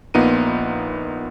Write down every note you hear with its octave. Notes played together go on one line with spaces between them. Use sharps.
A#1 A#3 B3 D#4 F4 D#7